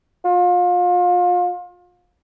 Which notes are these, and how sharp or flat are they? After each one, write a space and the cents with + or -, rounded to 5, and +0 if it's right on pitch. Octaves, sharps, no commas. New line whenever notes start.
F4 +30